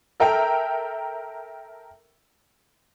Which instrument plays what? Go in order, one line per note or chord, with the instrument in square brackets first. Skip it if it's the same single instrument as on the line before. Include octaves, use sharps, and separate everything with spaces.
[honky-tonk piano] A4 A#4 E5 G5 A#5